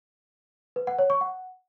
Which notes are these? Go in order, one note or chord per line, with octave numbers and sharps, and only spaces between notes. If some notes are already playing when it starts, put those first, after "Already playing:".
B4
F#5
C#5
C#6
F#5